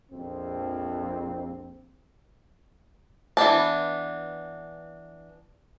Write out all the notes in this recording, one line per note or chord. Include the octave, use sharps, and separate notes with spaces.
A#1 F2 C4
E3 B3 D4 A5